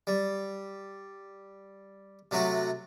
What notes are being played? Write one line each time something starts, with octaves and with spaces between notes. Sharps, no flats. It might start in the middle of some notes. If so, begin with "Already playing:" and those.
G3
C3 F#3 A3 F#4